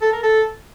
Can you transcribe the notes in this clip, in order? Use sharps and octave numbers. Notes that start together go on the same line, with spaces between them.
A4
A#4
A4